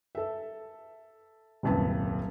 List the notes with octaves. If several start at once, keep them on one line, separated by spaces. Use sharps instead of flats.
A4 E5
D#1 C2 F#2 B4 A5